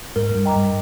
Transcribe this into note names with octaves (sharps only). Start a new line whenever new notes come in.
G#2 A#4
G2
D#5 G5 A#5 D6
G2